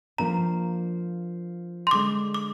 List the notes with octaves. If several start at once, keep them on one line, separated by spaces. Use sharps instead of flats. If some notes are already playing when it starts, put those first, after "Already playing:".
F3 A#3 D4 A#5
C6
D3 G#3 D4 D6
D6